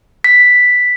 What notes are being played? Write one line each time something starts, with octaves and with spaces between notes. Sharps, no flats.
B6